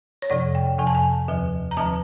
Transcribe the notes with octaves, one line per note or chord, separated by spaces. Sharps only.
C#5
F2 C3 F3 D5
G5
F2 C3 F3 G#5
A5
G#5
D#2 D3 F3
A#5
D#2 D3 F3 A5